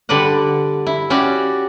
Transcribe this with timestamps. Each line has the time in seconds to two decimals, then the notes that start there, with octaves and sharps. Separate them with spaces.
0.09 D3 G3 B4 D5 F#5
0.86 E4
1.10 C#4 F#4 G4 D5